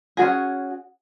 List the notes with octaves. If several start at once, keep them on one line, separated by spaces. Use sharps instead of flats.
C#4 F4 F#4 G#4